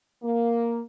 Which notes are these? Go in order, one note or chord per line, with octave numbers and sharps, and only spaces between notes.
A#3